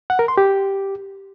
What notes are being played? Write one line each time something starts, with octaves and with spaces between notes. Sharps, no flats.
F#5
A#4
C6
G4